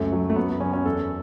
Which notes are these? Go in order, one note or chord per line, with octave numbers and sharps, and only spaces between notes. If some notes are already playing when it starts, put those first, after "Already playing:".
Already playing: C#2 F#2 A3
F#3
A3
F#2 B3
B3
F#2 C#4
C#4
E2 A4